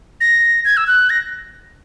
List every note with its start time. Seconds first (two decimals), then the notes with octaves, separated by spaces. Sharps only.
0.21 A#6
0.65 G#6
0.77 E6
0.87 F#6
1.10 A#6